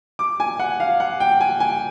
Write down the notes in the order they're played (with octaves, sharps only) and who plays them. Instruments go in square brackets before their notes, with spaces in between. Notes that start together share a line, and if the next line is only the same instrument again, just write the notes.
[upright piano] D6
G#5
F#5
F5
F#5
G5
G#5
G#5